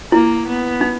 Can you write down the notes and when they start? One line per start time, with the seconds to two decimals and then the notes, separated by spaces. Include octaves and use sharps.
0.12 A#3 E4
0.47 B3
0.81 D#4